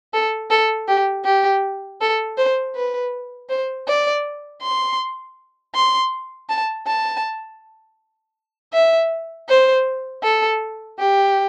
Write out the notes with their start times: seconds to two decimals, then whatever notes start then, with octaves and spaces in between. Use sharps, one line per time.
0.14 A4
0.51 A4
0.88 G4
1.25 G4
2.01 A4
2.37 C5
2.76 B4
3.50 C5
3.88 D5
4.62 C6
5.75 C6
6.49 A5
6.87 A5
8.74 E5
9.49 C5
10.24 A4
10.99 G4